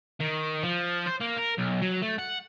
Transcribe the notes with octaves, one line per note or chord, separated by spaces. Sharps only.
D#3
F3
C5
A#3
A#4
B1
F#3
A3
F#5